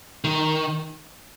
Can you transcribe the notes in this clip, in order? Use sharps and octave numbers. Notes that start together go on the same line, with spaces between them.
D#3